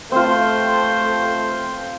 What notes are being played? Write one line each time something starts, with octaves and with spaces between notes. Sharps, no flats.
A3 C4 F4 C5